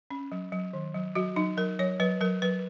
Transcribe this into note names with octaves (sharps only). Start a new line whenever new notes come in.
C#4
F#3
F#3
D#3
F#3
F#3 F#4
F#3 D#4
F#3 A#4
F#3 C#5
F#3 B4
F#3 A#4
F#3 B4